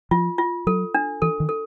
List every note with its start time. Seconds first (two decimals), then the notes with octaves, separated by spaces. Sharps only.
0.11 F3 F4
0.38 F4
0.67 F#3 A4
0.94 D4
1.22 E3 A4
1.40 D#3
1.49 A4